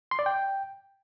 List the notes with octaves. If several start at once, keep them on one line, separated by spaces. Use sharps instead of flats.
C6
D5
G5